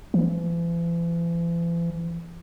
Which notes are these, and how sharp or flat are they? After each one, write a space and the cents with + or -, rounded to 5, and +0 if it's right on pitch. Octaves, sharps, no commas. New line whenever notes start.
E3 +45